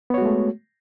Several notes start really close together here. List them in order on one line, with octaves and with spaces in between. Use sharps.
B3 C#5 F#4 G#3 A3